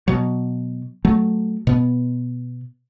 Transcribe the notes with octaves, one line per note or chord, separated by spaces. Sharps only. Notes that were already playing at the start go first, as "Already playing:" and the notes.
B2 F#3
F#3 A3
B2 B3